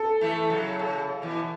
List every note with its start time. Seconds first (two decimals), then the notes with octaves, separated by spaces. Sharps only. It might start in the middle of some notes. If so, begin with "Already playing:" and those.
Already playing: A4
0.21 E3 A3
0.50 C#3 F#3
0.79 C#3
1.22 B2 E3